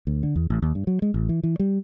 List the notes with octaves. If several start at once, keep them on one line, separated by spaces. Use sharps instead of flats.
D2
D3
E2
A1
D#2
G2
F#3
G#3
A1
E3
E3
G3